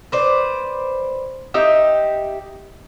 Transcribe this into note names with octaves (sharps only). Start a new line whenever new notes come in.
B4 C5 D5
D#4 G4 E5